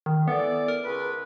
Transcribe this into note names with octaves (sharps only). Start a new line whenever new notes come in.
D#3
E3 B3 A4 D5
A#4
C#2 C#3 B4